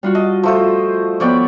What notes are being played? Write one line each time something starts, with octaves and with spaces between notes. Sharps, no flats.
G3 F4 F#4
D#5 A5
F3 A3 C5
F3 B3 C#5 D5 G5